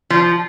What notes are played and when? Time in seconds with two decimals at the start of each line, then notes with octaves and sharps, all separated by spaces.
0.10 F3